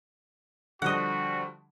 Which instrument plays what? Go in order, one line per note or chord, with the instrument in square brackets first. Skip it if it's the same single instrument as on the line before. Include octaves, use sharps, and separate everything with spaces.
[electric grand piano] D3 F3 G3 [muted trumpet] F#4 [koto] D#5 F#5